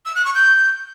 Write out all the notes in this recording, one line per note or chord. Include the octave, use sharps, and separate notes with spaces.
E6
F#6
C#6
G6